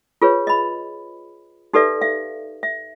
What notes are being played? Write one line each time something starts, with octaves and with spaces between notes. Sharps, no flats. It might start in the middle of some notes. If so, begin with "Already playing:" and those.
F4 G#4 B4 C#5
D#5 B5
D#4 G4 A4 B4 D5 E5
E5 F5
E5